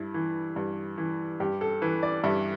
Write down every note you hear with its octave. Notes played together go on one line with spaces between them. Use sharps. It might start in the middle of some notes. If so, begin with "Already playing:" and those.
Already playing: G2 E4
E3
G2
E3
G2 G4
A4
E3 B4
D5
G2 E5